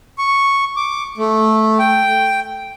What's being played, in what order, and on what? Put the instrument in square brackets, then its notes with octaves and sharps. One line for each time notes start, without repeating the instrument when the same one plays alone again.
[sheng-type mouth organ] C#6
D6
A3
G5